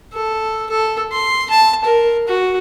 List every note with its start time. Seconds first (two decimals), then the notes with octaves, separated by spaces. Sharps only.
0.13 A4
0.70 A4
1.12 C6
1.50 A5
1.85 A#4
2.28 F#4